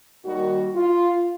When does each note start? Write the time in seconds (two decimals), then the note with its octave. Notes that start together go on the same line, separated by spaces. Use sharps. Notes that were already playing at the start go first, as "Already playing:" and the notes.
0.24 D#2 D#3 G3 F#4
0.75 F4